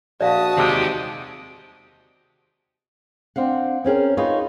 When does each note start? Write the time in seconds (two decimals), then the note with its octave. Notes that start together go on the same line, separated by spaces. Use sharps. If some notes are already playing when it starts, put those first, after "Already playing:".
0.21 A#1 F#4 D5 E5 F5 A5 D#6
0.58 C3 D#3 G#3 G4
3.36 C4 D4 F5 F#5
3.85 C4 C#4 G#4 A#4
4.17 D#4 F4 G#4 B4 C#5